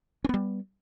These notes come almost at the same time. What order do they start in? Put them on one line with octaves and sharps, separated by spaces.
C#4 B3 G3